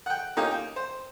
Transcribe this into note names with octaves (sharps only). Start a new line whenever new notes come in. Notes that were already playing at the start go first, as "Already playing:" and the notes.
F#5 G5
A#3 C#4 D#4 F4 G4
G5
C5